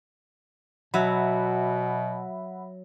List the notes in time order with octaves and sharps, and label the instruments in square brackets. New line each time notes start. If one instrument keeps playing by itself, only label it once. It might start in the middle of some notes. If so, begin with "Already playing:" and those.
[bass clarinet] B2 [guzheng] F#3 [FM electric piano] E5 F#5 B5